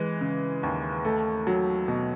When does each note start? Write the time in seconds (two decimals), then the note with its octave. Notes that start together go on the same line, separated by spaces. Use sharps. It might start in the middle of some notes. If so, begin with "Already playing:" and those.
Already playing: E3 G#3
0.21 C#3
0.63 D#2
1.05 A3
1.47 F#3
1.88 B2